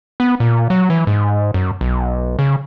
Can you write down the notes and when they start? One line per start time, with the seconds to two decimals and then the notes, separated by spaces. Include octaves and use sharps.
0.20 B3
0.40 A#2
0.70 F#3
0.90 E3
1.07 G#2
1.54 F#2
1.81 B1
2.39 C#3